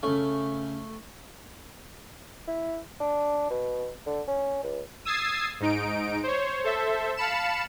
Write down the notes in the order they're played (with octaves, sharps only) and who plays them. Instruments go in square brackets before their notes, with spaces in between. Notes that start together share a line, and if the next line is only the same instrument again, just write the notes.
[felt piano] C#3 C#4 [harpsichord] A3
[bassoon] E4
D4
B2
D3
C#4
C#2
[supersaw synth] D#6 E6 G#6 A6 C7
G#2 D#4 D7
C5 C#5
A4 C5 E5
F5 A5 B5 C#7 E7